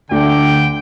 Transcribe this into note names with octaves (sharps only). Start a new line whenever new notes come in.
D2 D3 G5